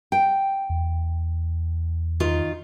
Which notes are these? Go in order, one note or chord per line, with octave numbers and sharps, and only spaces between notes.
G5
E2
D#3 F4